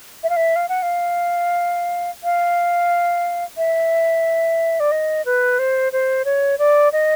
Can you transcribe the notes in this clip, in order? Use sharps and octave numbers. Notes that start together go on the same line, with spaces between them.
E5
F5
E5
F5
F#5
F5
F5
E5
D5
D#5
B4
C5
C5
C#5
D5
D#5